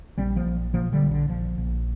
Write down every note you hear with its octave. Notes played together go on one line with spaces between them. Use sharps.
A#1 G3 C4
F3 A#3
A#1
A#2 F3 A#3
D3 G3
A#1
D3
A#1 F3
A#1